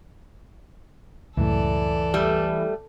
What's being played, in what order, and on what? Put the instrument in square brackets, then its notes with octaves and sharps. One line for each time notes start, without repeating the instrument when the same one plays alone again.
[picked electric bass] C#2 F#2 A2 [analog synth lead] E3 [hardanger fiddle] A4 D5
[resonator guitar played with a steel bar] G3 A3